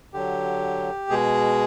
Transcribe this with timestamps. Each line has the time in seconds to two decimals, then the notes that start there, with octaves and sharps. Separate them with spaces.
0.13 D3 F#3 G4
1.10 B2 G#3 G#4